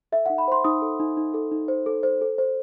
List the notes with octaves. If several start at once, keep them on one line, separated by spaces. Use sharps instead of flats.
A4 E5
D#4 F#5
B5
C5 C6
D#4 D#6
A4
D#4
D#4
A4
D#4
C5
A4
C5
A4
C5